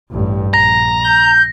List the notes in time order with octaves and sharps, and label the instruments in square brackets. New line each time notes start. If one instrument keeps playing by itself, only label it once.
[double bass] A1 G2
[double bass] A#1 [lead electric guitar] A#5 [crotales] A#6
[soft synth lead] G6